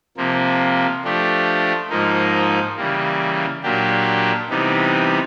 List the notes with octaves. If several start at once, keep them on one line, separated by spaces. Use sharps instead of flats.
C3 F3 A#3
F3 A3 D4 G4
G#2 F3 A#3 D#4
C#3 E3 G3 A#3
A#2 F#3 A#3 D4 G4
C3 E3 G3 B3 D#4